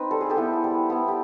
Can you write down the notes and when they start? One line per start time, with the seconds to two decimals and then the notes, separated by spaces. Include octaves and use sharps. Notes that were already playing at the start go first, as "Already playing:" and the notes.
Already playing: C4 D#4 B4
0.11 G3 A4
0.21 G#4
0.30 G4 A4
0.36 B3 E4
0.64 G3
0.90 B3 E4
1.08 G4